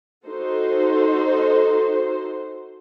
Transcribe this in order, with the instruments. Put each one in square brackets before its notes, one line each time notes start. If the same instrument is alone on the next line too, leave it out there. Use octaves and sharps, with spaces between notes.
[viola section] D#4 F#4 A4 C5